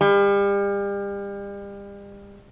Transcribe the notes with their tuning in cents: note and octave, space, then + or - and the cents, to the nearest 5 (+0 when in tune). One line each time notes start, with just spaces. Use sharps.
G3 +35